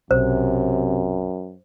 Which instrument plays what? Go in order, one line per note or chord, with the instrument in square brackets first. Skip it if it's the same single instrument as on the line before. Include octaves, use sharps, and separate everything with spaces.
[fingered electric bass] B1 [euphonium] F#2 [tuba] C3 [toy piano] C5